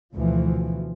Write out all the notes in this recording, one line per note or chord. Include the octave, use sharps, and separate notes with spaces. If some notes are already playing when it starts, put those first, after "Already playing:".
D2 B2 E3 F3